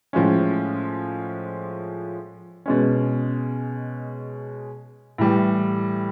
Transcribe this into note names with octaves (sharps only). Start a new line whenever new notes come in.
A2 F3 G#3 C#4
B2 G#3 C#4
A2 E3 G3